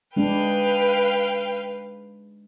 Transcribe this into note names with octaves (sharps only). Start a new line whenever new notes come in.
G#3 D4 B4 F5 G5